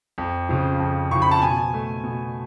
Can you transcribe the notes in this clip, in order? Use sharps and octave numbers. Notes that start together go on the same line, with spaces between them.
F2
C#3 F3
F2
C#3 F3 C#6
B5
A5
B2 G#5
A3
B2